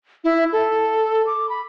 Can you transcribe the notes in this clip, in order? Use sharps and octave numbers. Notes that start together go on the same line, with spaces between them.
E4
A4
D6
B5